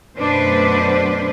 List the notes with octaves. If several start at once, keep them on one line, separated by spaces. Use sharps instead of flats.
F#2 B2 A3 D4 B4 C5